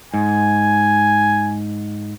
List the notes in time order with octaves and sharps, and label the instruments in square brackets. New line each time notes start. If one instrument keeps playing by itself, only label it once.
[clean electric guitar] G#2 [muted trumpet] G#5